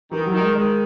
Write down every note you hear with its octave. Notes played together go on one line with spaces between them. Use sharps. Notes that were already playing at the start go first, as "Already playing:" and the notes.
D#3 E3
F#3
D#3
G#3
D#3 G#3